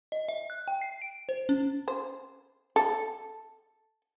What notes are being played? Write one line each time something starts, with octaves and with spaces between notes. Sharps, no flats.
D#5
E5
F#6
G5
C7
D7
C5
C#4
C5
A4